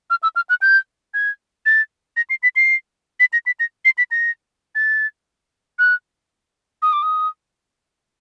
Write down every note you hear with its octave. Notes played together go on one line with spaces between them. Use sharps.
F6
E6
F6
F#6
G6
G#6
A6
A#6
C7
B6
C7
B6
A#6
B6
A#6
C7
B6
A#6
A6
F#6
D#6
D6
D#6